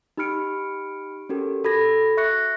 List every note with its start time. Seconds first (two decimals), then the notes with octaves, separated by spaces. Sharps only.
0.17 D#4 G4 B5 F6 C#7 D7
1.29 C#4 F#4 G4 A4 A#4
1.64 F#4 A4 B5 G#6 A#6
2.17 E5 C#6 F#6 A#6 C#7